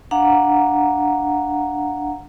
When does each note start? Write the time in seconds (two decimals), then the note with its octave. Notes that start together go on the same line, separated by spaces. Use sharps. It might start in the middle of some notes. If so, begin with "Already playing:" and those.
0.11 D4 F5 F#5 A#5